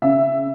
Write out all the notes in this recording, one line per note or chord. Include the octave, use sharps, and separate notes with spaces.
C#3 E5